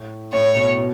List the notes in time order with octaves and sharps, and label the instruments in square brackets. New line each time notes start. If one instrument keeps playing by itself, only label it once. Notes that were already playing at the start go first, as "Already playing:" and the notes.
Already playing: [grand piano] A2
[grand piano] A2 [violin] C#5
[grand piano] B2
B2